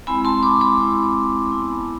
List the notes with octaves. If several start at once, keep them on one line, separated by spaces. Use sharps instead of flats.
G#3 C4 E4 G#5 B5
A5 C6
B5 D6
B5 D6
G#3 C4 E4
B3 E4